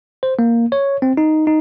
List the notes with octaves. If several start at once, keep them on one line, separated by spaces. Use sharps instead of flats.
C5
A#3
C#5
C4
D#4
D#4